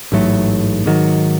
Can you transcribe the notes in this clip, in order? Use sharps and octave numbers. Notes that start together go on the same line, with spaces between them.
A1 G#2 F#3 A3
G#2 D#3 F#3